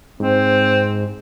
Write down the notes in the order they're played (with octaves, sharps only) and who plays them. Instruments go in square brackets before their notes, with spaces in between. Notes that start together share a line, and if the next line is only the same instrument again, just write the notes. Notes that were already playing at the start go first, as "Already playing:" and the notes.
[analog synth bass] G#2 [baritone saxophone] C4